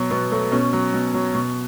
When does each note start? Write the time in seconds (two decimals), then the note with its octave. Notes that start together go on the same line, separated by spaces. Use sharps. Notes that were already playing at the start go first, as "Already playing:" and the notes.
Already playing: B2 F#3
0.11 B2 B3
0.32 F#3 A3
0.52 B2 C#4
0.73 F#3
0.94 B2
1.14 F#3
1.35 B2